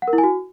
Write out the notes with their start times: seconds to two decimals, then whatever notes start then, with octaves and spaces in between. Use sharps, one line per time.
0.02 F#5
0.08 A#4
0.13 E4
0.18 G#5
0.24 F#4